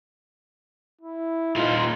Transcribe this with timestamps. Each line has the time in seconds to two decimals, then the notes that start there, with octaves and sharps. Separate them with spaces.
1.01 E4
1.56 A#2 D#4 F4